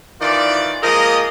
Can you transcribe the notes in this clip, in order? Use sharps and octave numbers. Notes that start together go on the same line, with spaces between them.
D#3 E3 F4 D5
F3 G#3 A#3 A#4 D#5